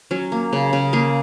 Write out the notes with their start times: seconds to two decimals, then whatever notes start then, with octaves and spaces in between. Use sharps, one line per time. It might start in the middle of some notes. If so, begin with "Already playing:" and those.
0.11 F#3 C#4
0.32 A#3
0.53 C#3
0.73 C#3
0.93 A#3 G#4